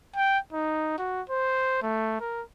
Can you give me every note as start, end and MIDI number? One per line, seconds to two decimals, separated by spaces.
0.16 0.38 79
0.53 0.94 63
0.98 1.21 66
1.30 1.82 72
1.82 2.17 57
2.20 2.42 70